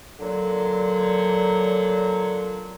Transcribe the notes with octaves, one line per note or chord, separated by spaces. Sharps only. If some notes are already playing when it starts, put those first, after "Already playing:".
A#2 D3 F#3